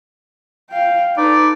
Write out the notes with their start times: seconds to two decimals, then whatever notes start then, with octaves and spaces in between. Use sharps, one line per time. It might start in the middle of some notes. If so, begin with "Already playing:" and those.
0.70 F5 G5
1.18 D#4 A4 B4 D5